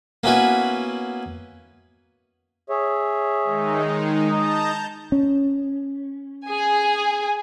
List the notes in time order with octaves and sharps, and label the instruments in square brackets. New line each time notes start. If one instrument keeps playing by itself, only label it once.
[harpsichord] A#3 B3 C#4 E4 F#4 B4
[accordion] G#4 C#5 E5
[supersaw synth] D#3 G#3 D#4
[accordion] D#4 D#6 [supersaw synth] A5 A#5 G6
[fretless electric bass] C#4
[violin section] G#4 G#5